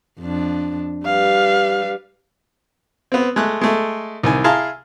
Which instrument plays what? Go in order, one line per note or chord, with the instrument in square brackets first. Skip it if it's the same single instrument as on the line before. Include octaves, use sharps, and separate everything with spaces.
[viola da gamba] F2 D4
[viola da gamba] G3 B4 [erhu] F5
[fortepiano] B3 C4
G#3 A3 F#6
G#3 A3
C2 D#3 G#5
E4 G#4 F5 A5 A#5 C6